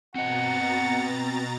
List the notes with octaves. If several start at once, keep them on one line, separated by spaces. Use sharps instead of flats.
B2 C4 D#5 F#5 A#5 A6